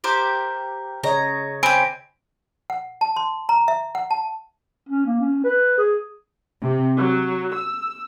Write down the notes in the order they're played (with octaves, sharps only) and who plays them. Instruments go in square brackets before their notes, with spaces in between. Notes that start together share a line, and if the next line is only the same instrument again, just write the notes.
[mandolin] G4 A#4 C5
[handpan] C#3 C#5 D#5 [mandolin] A#5
[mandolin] C4 G4 [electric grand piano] G#5 B5 [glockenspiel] D7
[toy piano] F#5
A5
C6
A#5
E5
F#5
A5
[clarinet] C#4
A#3
C#4
B4
G#4
[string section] C3
F#3
E6